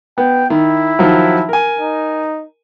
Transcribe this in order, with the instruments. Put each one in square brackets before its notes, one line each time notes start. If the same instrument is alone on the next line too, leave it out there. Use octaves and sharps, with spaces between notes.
[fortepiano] B3 [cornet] G5
[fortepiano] D#3 [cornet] E4
[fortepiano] D#3 F3 F#3
A#4 G#5
[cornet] D#4